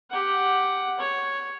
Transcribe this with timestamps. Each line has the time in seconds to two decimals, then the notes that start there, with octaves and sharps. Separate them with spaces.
0.11 G4 F#5
0.99 C#5